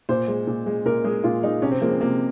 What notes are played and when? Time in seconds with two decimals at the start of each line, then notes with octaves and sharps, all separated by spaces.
0.09 A#2 C5
0.28 G#3
0.47 A#2
0.66 G#3
0.85 A#2 A#4
1.04 G#3 G#4
1.24 A#2 F4
1.43 G#3 D#4
1.62 C3 C#4
1.72 C4
1.81 F3 G#3 A#3
1.91 C4
2.00 C3 A#3